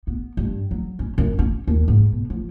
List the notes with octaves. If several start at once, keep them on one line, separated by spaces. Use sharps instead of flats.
B3
G2
F#3
C#4
F#2
C#4
D#2
G#2
B2
F3